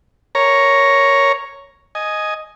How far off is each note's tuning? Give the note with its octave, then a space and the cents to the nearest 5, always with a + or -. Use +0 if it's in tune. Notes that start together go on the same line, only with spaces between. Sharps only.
A#4 +0 C#5 +0 A#5 +0
D#5 +0 G#5 +10